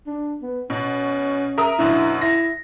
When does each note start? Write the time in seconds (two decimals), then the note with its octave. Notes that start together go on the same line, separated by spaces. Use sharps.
0.07 D4
0.42 B3
0.70 B2 C#4
1.58 A#4 E5 D#6
1.79 F#2 B2 D3 E4
2.21 E4 A#6